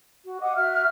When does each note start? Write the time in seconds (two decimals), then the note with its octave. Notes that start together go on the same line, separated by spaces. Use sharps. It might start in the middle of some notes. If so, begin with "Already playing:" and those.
0.25 F#4
0.41 D#5 F#5 D6 D#6
0.55 F#4 E5 F6